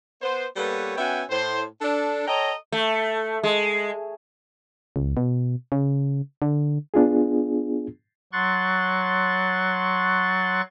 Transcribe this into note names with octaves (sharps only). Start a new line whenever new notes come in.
B3 C5
G3 A#3 B3 A4 B4 C#5
B3 C#4 F#4 E5 G5 G#5
A2 C5
D4 A4
A4 C#5 D#5 G5 A#5
A3
G#3
C#2
B2
C#3
D3
B3 D4 F4 G#4
F#3 C6 C#6 F#6 A6